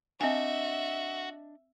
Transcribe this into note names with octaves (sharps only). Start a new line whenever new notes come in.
C4 D4 F#4 D#5 E5 G#5